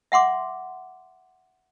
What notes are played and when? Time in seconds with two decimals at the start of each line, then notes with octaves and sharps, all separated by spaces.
0.12 E5 F#5 C6 D6